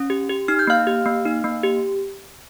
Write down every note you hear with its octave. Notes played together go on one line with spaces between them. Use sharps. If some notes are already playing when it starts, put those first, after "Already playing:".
Already playing: C#4
G4
G4
D#4 F6
G6
A#3 F5 F6
G4
A#3
D#4
A#3
G4